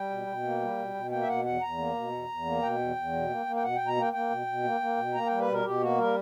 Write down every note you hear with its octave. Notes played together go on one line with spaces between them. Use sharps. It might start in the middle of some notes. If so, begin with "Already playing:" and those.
Already playing: G3 G5
B2
B2
A#3
G3
B2
B2
A#3 G5
E5
B2 F#5
E2 F#5
E2 A#5
A#3
B2
E2
E2
A#3
B2 G5
E2
E2
B2
A#3
A#3
G5
B2 F#5
B2 G5
A#5
A#3 G5
A#3 G5
B2
B2
A#3
A#3
B2
A#3 A#5
G3 G5
B4
B2 A#4
B2 G4
A#3 F#4
G3 A#4